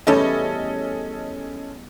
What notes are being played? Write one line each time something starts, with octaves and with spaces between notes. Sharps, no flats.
E2 G3 A3 C#4 A4 D#5